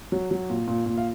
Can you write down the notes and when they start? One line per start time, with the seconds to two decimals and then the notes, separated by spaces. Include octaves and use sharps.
0.12 F#3
0.31 F#3
0.50 A#2
0.68 A#2
0.86 A#2
0.97 F5